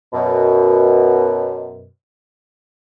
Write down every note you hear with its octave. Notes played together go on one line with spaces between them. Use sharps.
F#2 B2